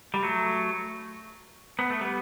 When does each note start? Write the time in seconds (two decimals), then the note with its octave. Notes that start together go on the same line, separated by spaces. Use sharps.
0.14 G3
0.23 F#3 A3
1.79 B3
1.90 A3
2.01 G3 B3